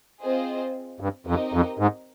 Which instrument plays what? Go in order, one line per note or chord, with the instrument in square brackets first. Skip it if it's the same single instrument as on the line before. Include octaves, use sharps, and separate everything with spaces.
[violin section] C4 F4 G#4 C5 D#5
[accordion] G2
[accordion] F2 [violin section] C4 D#4 G4 A#4 D#5
[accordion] F2
G#2